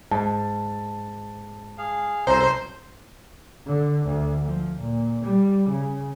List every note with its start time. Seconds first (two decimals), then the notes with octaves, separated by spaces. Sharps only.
0.11 G#2 A5
1.78 G#4 F5
2.27 C2 F#2 A4 C5 A#5
3.66 D3
4.06 D2
4.45 F3
4.79 A#2
5.24 G3
5.69 C#3